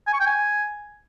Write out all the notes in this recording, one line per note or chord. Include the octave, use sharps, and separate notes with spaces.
G#5
C#6
G5
G#5